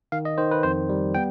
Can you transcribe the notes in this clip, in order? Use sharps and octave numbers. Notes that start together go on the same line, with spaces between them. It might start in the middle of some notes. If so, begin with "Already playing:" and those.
D#3 F5
D#5
D#3 C5
B4
F2 C5
G3
B3 G5